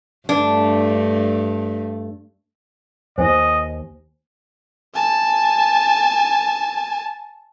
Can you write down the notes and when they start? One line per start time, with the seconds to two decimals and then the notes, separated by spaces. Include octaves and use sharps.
0.29 G2 A3 D4
3.18 D#2 C5 D#5 G#5
4.95 G#5 A5